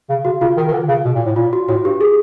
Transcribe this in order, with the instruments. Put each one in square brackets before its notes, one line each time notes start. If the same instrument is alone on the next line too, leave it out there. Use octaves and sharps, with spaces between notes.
[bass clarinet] C#3
[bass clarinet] C#3 [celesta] F#4
[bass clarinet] C#3 [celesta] F4
[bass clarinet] D#3
D#3
D3
C#3
B2
A#2
A2
[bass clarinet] A#2 [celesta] F4
[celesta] F#4
[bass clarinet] A2 [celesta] F#4
[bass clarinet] G2 [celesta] G4
[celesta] G#4